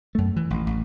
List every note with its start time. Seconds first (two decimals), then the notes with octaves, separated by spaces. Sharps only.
0.15 F#2 A3
0.36 E3
0.50 A1
0.67 A1